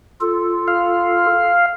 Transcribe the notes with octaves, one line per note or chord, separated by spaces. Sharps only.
F4 A4
F5